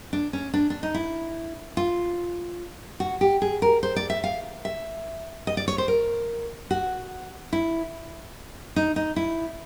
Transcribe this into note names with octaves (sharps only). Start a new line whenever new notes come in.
D4
C#4
D4
D4
D#4
E4
F4
F#4
G4
G#4
A#4
C5
D5
E5
F5
E5
D#5
D5
C#5
C5
A#4
F#4
E4
D#4
D#4
E4